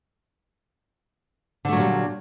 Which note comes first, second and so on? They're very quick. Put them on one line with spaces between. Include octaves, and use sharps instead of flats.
D3 A3 F#3 A#2 G3